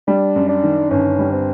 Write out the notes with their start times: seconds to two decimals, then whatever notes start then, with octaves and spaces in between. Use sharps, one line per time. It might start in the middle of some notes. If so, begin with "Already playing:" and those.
0.08 G3 D4
0.36 F#2
0.49 D4
0.63 D#3
0.91 G1 C#4
1.19 G3
1.32 C4